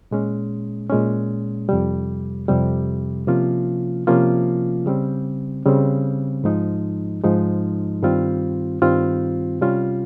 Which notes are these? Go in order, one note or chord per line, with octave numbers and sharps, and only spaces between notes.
A#2 G#3 C#4
A#2 G#3 C#4
F2 C3 G3
F2 C3 G3
C3 F3 A#3 C#4 F4
C3 F3 A#3 C#4 F4
C#3 G3 C4
C#3 G3 C4
G#2 F3 G#3 D#4
G#2 F3 G#3 D#4
G2 D#3 G3 C4 F4
G2 D#3 G3 C4 F4
C3 G3 C#4 F4